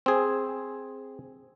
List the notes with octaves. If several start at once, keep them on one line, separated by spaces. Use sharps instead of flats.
C4 G#4